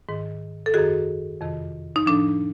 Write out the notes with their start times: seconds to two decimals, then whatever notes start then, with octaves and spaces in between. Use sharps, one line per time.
0.09 G#2 D#3
0.66 A4
0.74 F#2 D#3 F#4 G#4
1.41 F2 C3 D#3
1.96 D#4
2.06 A2 F3 D4